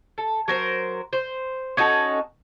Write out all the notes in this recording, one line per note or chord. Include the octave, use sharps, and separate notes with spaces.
A4
F#3 A#4 C5
C5
C#4 D#4 F#4 A4